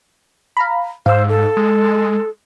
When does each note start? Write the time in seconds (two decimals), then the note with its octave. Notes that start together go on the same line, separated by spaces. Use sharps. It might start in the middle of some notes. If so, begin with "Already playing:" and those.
0.57 F5 A#5 B5
1.06 G#2 C5 F5 E6
1.29 A4
1.57 G#3